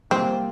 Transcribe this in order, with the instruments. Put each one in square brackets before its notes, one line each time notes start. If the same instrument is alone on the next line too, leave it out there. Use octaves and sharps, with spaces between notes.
[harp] C3 G3 A#3 F4 [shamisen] C4